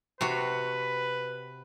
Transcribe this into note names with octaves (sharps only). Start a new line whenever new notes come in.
C3 F#4 B4